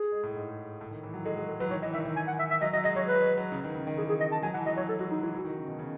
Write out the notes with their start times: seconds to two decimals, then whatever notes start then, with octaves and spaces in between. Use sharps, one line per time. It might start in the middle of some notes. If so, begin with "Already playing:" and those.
Already playing: G#4
0.12 G#3
0.23 A2
0.36 G#2
0.81 A2
0.91 D#3
1.03 E3
1.14 F#3
1.25 G#3 A4
1.37 F#3 G#4
1.48 G#3 A4
1.60 F#3 B4
1.67 E3
1.71 D#3 C#5
1.82 E3 D#5
1.93 D#3 E5
2.05 D#3
2.16 G#5
2.27 F#5
2.39 E5
2.50 E5
2.61 F#3 D#5
2.73 F#3 D#5
2.84 G#3 D#5
2.96 F#3 C#5
3.07 B4
3.22 G#3
3.38 F#3
3.52 C#3
3.64 D#3
3.75 C#3
3.87 D#3
3.97 E3 G#4
4.09 G#4
4.20 D#5
4.32 A5
4.42 F#3 G#5
4.54 E3 F#5
4.66 F#3 D#5
4.77 F#3 C#5
4.88 F#3 A4
4.99 G#3 F#4
5.11 F#3 D#4
5.22 E3 E4
5.34 E3 F#4
5.44 D#3
5.57 C#3
5.68 B2
5.79 C#3